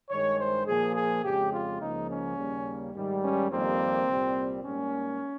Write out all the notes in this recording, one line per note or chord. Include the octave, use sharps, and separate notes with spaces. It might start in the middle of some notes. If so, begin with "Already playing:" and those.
G2 D#3 G#3 C#5
C5
A#2 F3 A#3 G#4
G#4
F2 C#3 G#3 G4
F4
C#2 C#3 F3 A#3 D#4
C#4
D#2 C#3 G3 A#3
G#2 D#3 G3
C#4
F2 D#3 G3 A#3 C4
C2 A#2 G3
G#2 G3 A#3 C#4